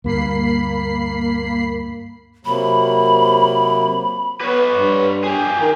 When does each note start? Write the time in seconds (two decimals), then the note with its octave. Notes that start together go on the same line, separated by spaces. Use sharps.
0.04 D2 G2 A#3 B5 C7
2.45 C3 F#3 A#3 B5
4.41 B3 B4 C#5
4.72 G2
5.24 G4 G#4
5.61 D#3